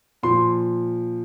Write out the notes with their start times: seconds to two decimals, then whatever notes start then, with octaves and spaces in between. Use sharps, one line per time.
0.23 A#2 F3 C6